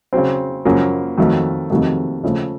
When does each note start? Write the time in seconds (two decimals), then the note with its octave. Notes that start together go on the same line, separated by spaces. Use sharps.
0.13 C#3 F#3 C4
0.65 F#2 C#3 F3 A#3
1.17 F2 D#3 F#3 A3
1.70 F2 C3 D#3 F#3 A3
2.24 C#3 F3 A3